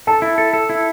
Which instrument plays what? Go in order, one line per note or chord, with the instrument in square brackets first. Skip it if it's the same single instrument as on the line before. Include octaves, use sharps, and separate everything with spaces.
[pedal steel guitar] A4 [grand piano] A5
[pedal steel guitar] E4
A4
A4
E4